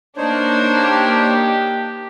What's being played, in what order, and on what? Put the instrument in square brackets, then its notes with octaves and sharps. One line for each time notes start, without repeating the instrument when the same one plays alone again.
[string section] A#3 D4 [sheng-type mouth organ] D#4 C5 C#5
[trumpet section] G4